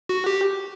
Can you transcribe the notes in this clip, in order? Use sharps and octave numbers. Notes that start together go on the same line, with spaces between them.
F#4
G4